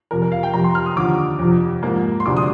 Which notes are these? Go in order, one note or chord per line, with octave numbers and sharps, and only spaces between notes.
F2 C3 F3 A#4
A#4
F5
G5
F2 C3 F3 A#5
C6
F6
D#6
D#2 D3 F3 D6
F2 C3 F3
G#2 F3 A#3
C6
D2 C3 F3 G#3 D4 D6
D#6